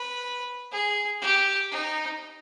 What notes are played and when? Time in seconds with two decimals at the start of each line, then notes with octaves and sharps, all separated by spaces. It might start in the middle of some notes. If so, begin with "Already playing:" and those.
Already playing: B4
0.72 G#4
1.22 G4
1.71 D#4